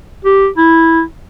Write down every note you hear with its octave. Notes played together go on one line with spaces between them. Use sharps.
G4
E4